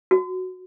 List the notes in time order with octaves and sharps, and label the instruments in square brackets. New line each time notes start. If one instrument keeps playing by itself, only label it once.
[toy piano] F#4